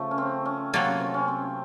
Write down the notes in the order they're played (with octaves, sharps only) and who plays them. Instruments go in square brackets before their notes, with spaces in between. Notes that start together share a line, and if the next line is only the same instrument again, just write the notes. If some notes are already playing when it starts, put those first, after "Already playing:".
Already playing: [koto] C#3 [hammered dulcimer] F3 A3
[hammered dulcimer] C#4
C4
C#4
[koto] C3 F#3 A#3 F4 A4
[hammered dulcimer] C#4
C4
C#4
C4